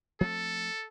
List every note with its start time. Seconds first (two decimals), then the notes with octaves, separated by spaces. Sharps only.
0.21 F3 A3 C4 A4